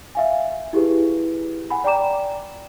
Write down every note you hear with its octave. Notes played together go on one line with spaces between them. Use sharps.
E5 F5 G#5
E4 G4 G#4 B4
F#5 G#5 B5
D5 G5 A#5 D6 E7